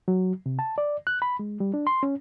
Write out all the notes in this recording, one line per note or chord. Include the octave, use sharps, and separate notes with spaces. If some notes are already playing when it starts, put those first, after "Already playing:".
F#3
C3
A5
D5
F#6
B5
G#3
G3
D4
C6
C#4